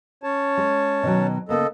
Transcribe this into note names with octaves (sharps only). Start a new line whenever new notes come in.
C#4 C#5 A5
G#3
B2 D#3 F#3
C#3 A#3 B3 A4 D#5